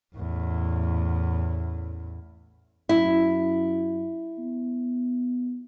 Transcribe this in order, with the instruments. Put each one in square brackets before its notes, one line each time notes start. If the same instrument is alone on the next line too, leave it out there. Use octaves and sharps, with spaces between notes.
[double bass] A1 E2
[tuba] F#2 [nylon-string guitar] E4
[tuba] B3